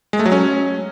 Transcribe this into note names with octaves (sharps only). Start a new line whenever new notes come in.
G#3
A3
F#3
C#4